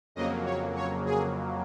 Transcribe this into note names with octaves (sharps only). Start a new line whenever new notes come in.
F2 C#3 F#3 A#3 D#5
C#5
C#5
G#4